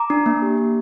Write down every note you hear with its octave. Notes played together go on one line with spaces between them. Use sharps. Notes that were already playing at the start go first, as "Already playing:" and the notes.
Already playing: A#5 D6
D4
A#3
G4
A#3